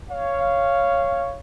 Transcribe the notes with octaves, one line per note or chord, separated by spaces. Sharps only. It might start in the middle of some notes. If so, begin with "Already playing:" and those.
C#5 F5